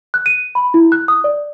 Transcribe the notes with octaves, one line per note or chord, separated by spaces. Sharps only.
F#6
D#7
B5
E4
F#6
D#6
D5